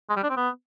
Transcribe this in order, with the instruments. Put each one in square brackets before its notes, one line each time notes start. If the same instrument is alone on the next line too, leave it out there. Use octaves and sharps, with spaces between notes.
[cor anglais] G#3
G3
D4
C4
B3